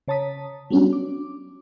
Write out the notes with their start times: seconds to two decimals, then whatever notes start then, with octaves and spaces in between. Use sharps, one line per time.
0.08 C#3 C#5 A5 A#5 D#6 B6
0.70 F#3 G3 B3 C#4 D4 F#4
0.93 D6